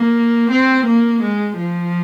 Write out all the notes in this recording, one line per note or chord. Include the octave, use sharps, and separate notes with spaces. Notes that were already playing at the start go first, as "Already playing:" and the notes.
Already playing: A#3
C4
A#3
G#3
F3